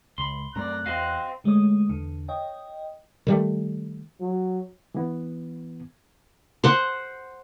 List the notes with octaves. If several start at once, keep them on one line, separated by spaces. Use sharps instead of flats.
C#2 B5 C6
F#2 A3 C4 D5 A#5 F#6
E2 C4 F#4 D#5 F5
D3 G#3 A3 C#5 D#6
E2 D3
C#5 D#5 G5
D#3 G3 A3
F#3
E3 B3
C5 F#5